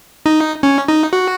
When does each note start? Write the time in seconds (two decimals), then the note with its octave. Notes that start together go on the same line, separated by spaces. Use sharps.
0.26 D#4
0.63 C#4
0.88 D#4
1.13 F#4